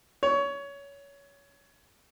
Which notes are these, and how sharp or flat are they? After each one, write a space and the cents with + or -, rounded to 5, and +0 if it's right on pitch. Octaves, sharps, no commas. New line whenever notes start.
C#5 +20